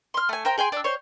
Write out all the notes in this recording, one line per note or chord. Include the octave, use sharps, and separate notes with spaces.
C6 F6
A3 G#5
A#4 C5 G5
G#4 G5 G#5 C6
D4 E6
C5 C#5